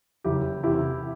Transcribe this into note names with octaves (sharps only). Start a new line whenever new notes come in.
F#1 E4 G4
E2 C3 E4 G4